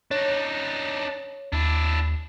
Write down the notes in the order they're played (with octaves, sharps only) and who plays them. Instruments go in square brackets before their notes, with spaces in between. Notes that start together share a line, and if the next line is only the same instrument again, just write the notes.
[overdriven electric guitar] D4 D#4 [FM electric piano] C#5
[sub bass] D#2 [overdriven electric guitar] D4 E4